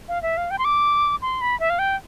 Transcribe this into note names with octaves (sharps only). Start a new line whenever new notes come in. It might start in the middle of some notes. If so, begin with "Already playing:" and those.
F5
E5
F5
G5
C6
D6
C6
B5
E5
F5
G5